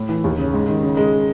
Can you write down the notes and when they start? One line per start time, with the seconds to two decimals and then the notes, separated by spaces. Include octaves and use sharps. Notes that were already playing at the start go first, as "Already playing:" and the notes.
Already playing: A2
0.09 E3
0.24 D#2
0.38 C#3
0.54 G#2
0.68 D#3
0.83 C#3
0.97 G#3